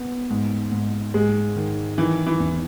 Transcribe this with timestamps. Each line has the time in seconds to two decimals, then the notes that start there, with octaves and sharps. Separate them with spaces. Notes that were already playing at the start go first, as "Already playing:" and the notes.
Already playing: B3
0.30 G#2
0.72 G#2
1.14 G#2 G#3
1.56 D#3
1.98 D#3 E3
2.26 E3
2.40 E2